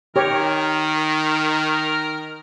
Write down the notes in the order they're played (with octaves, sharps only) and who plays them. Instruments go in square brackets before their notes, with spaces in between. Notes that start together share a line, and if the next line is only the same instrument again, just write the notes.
[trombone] D#3 [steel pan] G4 C#5 [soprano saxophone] A#4